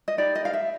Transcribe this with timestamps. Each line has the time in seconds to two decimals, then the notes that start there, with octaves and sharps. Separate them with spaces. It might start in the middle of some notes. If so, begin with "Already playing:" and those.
0.08 D#5
0.18 D#4 G4 B4 D5
0.35 D#5
0.45 F5
0.54 E5